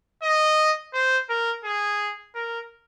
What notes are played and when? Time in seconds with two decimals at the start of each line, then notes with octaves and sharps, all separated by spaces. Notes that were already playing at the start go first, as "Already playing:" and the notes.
0.23 D#5
0.94 C5
1.30 A#4
1.64 G#4
2.35 A#4